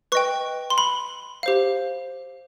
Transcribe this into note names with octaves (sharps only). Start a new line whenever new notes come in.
B4 D#5 G5 C#6
C6
B5
G4 C5 F5